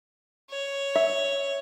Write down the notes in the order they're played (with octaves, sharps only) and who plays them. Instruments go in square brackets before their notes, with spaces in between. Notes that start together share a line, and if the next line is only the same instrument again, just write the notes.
[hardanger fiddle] C#5
[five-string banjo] E5